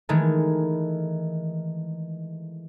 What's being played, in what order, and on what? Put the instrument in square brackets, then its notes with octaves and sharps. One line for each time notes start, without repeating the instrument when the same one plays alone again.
[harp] D#3 E3 G#3 A3